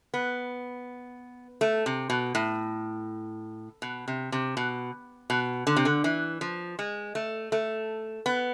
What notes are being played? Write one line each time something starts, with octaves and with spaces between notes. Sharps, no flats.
B3
A3
C3
B2
A2
B2
C3
C3
B2
B2
D3
C3
D3
E3
F3
G#3
A3
A3
B3